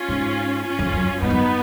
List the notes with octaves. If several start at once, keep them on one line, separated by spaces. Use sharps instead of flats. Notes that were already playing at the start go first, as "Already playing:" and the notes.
Already playing: C#4 F4
G#2
C#4 F4
F2
F#2
G#2 B3 D#4
F#2